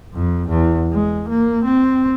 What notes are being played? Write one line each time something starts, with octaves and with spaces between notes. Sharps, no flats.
F2
E2
G#3
A#3
C4